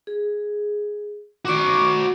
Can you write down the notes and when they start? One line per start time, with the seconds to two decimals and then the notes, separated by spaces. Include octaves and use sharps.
0.07 G#4
1.45 F#4 D5 C#6 D6